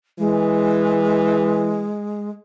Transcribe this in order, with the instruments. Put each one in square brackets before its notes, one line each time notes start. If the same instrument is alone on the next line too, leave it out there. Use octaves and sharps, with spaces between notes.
[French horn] E3 [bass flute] G#3